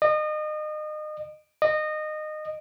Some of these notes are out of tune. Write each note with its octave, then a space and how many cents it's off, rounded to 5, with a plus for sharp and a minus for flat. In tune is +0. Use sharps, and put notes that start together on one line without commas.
D#5 -30
D#5 -20